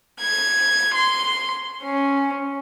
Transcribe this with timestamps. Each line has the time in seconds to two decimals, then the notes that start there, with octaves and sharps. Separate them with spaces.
0.20 G#6
0.94 C6
1.83 C#4